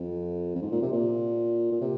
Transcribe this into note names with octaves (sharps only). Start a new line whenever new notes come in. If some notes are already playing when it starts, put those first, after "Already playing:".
Already playing: F2
F2
G#2
A#2
C3
A#2
A#2
C3